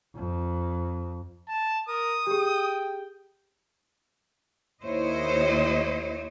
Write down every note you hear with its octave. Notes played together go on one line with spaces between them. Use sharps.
F2
A5
A#4 D#6
G4 G#4 G5
D#2 E4 C5 C#5 D#5